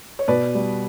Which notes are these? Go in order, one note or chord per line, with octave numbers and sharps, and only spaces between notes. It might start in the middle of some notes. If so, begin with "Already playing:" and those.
C#5
B2 B4 D5
G3